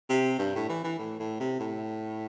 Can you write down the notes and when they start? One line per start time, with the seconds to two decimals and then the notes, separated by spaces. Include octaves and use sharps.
0.09 C3
0.39 G2
0.55 A2
0.69 E3
0.84 E3
0.99 A2
1.19 A2
1.40 C3
1.60 A2